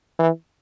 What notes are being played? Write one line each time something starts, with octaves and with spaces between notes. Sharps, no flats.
E3